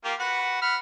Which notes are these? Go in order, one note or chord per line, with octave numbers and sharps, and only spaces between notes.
A#3 F4 G4
F#4 B4 F#5
F#5 B5 F6